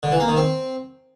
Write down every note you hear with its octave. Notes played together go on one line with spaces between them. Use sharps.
D3
E3
A#3
D#3
C4